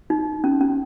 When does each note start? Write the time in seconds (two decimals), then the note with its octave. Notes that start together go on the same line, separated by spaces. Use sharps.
0.10 D#4
0.44 C#4
0.61 C#4